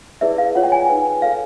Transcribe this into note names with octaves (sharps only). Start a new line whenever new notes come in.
E4 G#4 B4 D5 E5
F5
F4 G#4 C#5 F#5
G5
G#5
D#4 G#4 B4 G#5
F4 A4 C#5 F5